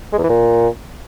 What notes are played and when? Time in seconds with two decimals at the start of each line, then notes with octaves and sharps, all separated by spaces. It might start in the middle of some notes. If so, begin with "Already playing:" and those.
0.13 G#3
0.18 E2
0.24 E3
0.29 A#2